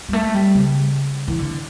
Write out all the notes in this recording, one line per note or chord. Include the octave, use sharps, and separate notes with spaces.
G3
A3
G3
C#3
E3
D3